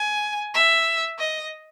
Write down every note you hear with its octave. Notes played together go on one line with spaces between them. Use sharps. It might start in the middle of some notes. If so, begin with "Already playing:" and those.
Already playing: G#5
E5
D#5